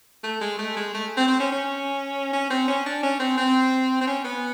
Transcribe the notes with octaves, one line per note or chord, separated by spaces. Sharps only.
A3
G#3
A3
G#3
A3
C4
C4
C#4
C#4
C#4
C4
C#4
D4
C#4
C4
C4
C4
C#4
B3